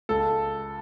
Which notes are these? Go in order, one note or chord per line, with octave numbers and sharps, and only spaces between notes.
C#2 A4